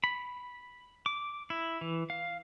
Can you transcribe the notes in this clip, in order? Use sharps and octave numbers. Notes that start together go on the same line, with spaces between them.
B5
D6
E4
E3
F5